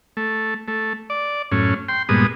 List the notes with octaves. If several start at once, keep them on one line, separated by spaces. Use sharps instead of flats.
A3
A3
D5
F#2 A2 C#4
G5 C6
G2 A#2 G#3 B3 D#6